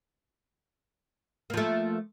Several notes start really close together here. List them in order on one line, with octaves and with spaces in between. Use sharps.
A#3 F3 A3